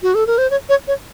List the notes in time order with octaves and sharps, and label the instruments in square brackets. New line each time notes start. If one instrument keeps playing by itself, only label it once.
[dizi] F#4
A4
A#4
C5
C#5
C#5
C#5